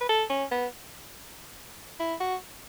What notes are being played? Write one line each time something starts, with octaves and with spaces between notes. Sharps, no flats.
B4
A4
C#4
B3
E4
F#4